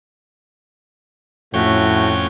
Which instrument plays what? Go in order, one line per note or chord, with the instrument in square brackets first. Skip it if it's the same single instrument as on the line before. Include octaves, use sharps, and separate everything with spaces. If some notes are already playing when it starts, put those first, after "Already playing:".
[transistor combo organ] F2 C#4 G5 [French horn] A2 [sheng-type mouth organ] A3 F#4